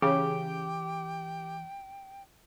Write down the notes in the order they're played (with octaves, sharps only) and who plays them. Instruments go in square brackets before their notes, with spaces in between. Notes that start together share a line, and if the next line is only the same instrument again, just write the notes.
[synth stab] C#3 [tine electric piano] E3 [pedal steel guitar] G4 [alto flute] G5